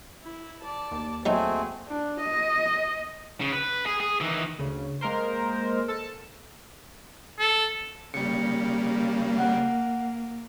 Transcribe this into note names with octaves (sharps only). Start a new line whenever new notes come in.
E4
D5 A5
D#2
F#3 A3 C4 D#4 F#4 G#4 G#5
D4
D#5
C#3
B4
G#4
G#4
D#3 E3
D2 C#3
G#3 A#3 A#4 C5
A4 A5
A4
C#3 G3 A#3 C#7
F#5